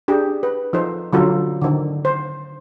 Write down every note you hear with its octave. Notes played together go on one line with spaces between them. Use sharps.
D4 G4 G#4
B4
F3 D#4 A4 C5
D3 F#3 F4 A4
D3 D#3
C5